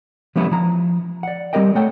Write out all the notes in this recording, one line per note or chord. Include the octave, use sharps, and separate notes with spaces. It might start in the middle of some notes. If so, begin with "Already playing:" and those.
F3 G3 A#3 B3 C#4 E4
F3 E4 A#5
D5 F#5
G3 C4 G4 A#4 D#5 G5
A3 A4 C#5 F#5 G5